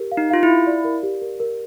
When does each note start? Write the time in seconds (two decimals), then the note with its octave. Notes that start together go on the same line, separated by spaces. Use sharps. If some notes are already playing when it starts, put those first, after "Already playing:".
Already playing: G4 A#4
0.12 F5
0.17 D#4
0.30 F4 F5
0.43 E4
0.48 F5
0.67 D5
0.85 A#4
1.03 G4
1.22 A#4
1.40 A#4